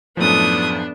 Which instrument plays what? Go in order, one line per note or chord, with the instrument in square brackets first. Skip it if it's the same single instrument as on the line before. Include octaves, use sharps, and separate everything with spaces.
[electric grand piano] F#2 A2 F3 [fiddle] A3 D#6 [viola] B3 D4